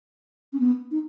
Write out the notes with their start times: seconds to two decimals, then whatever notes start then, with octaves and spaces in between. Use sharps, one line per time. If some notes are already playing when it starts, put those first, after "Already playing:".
0.52 C#4
0.59 B3
0.91 D#4